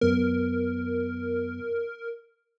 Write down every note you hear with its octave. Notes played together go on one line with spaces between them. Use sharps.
F#2 B3 A#4